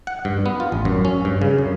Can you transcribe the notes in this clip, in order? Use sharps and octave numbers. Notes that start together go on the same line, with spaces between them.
F#5
G2
B3
F4
A1
F#2
C#4
G2
C#3
F#2